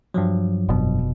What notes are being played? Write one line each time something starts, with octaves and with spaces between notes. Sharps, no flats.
G2 F3 F#3
F1 B2